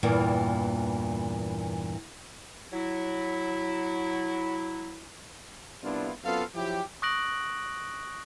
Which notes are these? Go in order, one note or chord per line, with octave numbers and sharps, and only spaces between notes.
E2 G2 A#2 E3 A#3 G5
F#3 E4
C2 B3 D4 E4 F4
F#2 B3 C4 F4 A4 F5
F3 F#3 E4 G4
C#6 D#6 F#6 A#6 D7 F#7